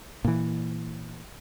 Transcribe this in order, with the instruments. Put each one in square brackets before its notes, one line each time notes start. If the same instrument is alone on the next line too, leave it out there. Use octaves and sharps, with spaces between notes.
[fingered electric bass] A#2 E3